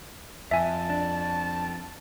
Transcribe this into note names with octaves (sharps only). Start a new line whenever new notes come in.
F2 E5 G#5 A5
D4